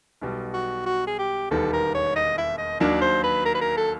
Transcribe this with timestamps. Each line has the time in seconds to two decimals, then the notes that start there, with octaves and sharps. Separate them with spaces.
0.22 B1 B2 G3
0.54 F#4
0.86 F#4
1.07 G#4
1.19 G4
1.51 E1 D#2 D#3 G3 B3 A4
1.73 A#4
1.94 C#5
2.16 D#5
2.38 E5
2.58 D#5
2.80 D#2 D#3 F#3 A#3 D4 D5
3.01 C5
3.24 B4
3.45 A#4
3.55 B4
3.61 A#4
3.77 A4